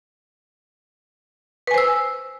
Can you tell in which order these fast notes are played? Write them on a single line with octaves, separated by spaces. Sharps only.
B4 G#5 C5 E6